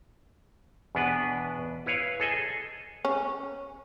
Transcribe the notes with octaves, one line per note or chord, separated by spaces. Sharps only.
E2 B2 B3 D4 B4
E4 B4 C#5 F5
G#4 A4 D#5 G#5
C#4